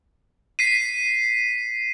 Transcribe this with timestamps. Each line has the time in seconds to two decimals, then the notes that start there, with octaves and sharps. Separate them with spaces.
0.59 B6 C7 D#7